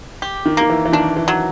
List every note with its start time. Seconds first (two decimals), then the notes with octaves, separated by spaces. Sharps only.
0.22 G4
0.46 D#3
0.57 D#3 A#3
0.70 E3
0.85 E3
0.93 D#3 D4
1.17 E3
1.28 F#3